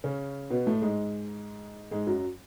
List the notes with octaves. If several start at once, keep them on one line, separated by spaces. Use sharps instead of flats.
C#3 C#4
B2 B3
A2 A3
G#2 G#3
G#2 G#3
F#2 F#3